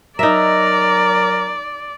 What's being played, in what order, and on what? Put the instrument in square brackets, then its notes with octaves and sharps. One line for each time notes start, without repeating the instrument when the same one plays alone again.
[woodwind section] F#3 A#4 A#5 [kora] D#4 E5 [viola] D5